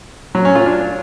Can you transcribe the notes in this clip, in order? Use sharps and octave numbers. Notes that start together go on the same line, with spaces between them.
F#3
C#4
F4
D4